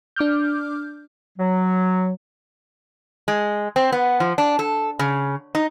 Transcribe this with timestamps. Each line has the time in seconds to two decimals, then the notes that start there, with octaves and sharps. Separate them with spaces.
0.16 D4 D6 F6 G6
1.38 F#3
3.28 G#3
3.76 C4
3.92 B3
4.20 F3
4.38 D4
4.59 A4
4.99 C#3
5.55 D#4